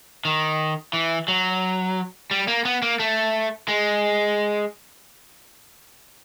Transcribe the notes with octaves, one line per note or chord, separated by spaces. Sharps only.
D#3
E3
F#3
G3
A#3
B3
A#3
A3
G#3